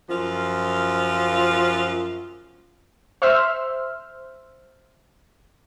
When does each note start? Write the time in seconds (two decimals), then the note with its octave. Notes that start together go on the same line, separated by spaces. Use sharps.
0.10 F#2 F3 F4
3.22 C5 E5 C6 E6 F6